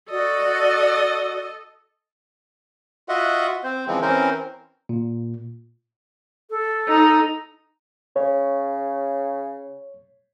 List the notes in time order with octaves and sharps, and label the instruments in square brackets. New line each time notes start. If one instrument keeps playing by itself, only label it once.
[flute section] F#4 D5 [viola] A4 D#5
[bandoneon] F4 F#4 D#5 E5 F#5
C4 C5
C#3 E3 F3 G#3 C4
E3 C4 C#4 A#4 C5
[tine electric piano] A#2
[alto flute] A4
[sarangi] D#4
[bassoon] C#3 [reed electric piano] C#5